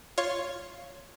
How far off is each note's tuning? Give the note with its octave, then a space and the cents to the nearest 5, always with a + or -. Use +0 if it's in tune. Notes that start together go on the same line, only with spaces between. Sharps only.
F4 +0 C#5 +0